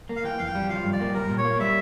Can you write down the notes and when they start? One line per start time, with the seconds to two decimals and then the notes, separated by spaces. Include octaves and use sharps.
0.09 A#3
0.16 F5
0.24 E3 G5
0.39 F2 F5
0.47 G5
0.55 G3
0.69 F3 F5
0.84 G2
0.93 D5
1.00 A#3
1.14 G3 A#4
1.29 A#2
1.38 C#5
1.45 A#3
1.59 G3 E5